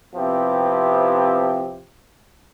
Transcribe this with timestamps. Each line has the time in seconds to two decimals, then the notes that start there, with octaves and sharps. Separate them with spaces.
0.15 C3 F3 B3 C4 E4 G4